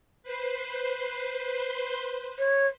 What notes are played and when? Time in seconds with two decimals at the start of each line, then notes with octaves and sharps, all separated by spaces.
0.23 B4 C5 C6
2.38 C#5